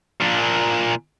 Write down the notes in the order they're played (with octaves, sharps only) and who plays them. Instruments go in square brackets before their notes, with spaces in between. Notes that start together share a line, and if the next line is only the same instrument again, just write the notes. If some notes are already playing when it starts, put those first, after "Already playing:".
[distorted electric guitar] A#2 D4